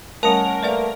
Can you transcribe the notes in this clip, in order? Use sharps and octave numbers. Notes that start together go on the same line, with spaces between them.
G3 A3 C#4 A#4 F#5 A5
A3 A#3 B4 D5 F#5